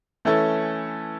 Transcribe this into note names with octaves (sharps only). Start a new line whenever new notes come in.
E3 A3 C#4 E4 A4